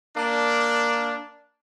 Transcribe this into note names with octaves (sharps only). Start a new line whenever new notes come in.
A#3 D4